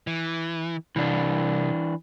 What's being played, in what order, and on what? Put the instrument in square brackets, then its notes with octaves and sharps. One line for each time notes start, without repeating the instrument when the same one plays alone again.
[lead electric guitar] E3
[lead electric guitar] C2 [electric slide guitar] E3 D4